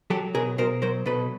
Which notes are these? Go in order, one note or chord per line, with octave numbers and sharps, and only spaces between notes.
F#3 G4 A4
B2 G#4 A#4
B2 A#4 C5
F#3 A#4 C5
B2 A4 B4